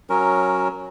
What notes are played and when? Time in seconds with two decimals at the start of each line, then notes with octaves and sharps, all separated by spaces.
0.10 F#3 C#4 A#4